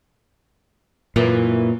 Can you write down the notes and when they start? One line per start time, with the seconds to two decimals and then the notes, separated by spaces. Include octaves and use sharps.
1.16 F#2 A#2 E3 A#3